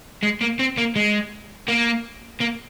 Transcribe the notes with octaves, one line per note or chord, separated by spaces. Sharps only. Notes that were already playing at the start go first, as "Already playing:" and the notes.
G#3
A#3
C4
A#3
G#3
A#3
A#3